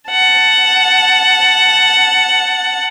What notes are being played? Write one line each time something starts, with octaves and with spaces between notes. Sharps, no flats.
F#5 A5